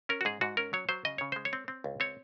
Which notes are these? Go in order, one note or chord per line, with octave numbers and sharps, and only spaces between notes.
C#4 A#4
F#4
G#2 G#4
G#2 F#4
C#4 A#4
F#3 C#5
F#3 C5
C#3 D#5
C#3 C#5
G#3 C5
C#5
C4
C4
C#2
C4 C#5